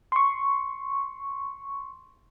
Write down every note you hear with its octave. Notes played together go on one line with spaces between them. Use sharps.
C6 C#6